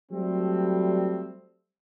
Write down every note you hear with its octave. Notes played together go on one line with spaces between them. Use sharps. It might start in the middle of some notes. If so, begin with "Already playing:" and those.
F#3 G3 A3 C4